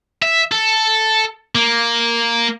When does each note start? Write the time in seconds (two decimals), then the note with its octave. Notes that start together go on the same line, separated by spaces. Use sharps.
0.22 E5
0.51 A4
1.55 A#3